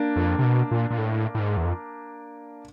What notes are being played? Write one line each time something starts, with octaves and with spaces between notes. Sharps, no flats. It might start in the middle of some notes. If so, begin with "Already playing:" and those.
Already playing: A#3 D4
F2
C3
B2
A#2
A#2
A2
A2
G#2
E2
F2